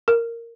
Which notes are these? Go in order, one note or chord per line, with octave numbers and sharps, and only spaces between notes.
A#4